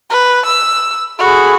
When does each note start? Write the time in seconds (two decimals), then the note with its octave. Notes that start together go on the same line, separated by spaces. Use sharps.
0.10 B4
0.46 E6
1.19 F#4 G#4 A4 B5